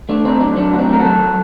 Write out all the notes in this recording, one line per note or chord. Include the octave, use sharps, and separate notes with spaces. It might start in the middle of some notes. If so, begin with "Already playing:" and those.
A3 D4
D2 C4 D#4
F#3 D4
F#3 D4
D2 F#4
C4 D#4
A3 A#4
F#4 A4
F#3